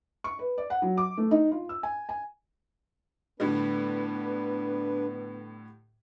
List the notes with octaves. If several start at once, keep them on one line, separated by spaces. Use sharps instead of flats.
C#6
B4
D5
F#5
F#3
D6
A3
D#4
F4
E6
G#5
G#5
A2 D3 G3 B3 D4 B4